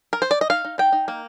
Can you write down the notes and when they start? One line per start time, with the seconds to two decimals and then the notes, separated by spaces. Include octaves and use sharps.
0.13 A#4
0.22 C5
0.31 D5
0.41 D#5
0.50 D#4 F5
0.65 D#4
0.78 D#4 G5
0.92 D#4
1.08 A#3